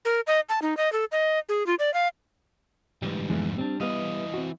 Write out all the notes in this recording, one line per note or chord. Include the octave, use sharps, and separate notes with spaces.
A#4
D#5
A5
D#4
D#5
A4
D#5
G#4
F4
D5
F5
D2 G#2 E3 G3
F2 E3 G#3 B3
G3 C4 D4
E3 G3 B3 D#5 F5
C4 F#4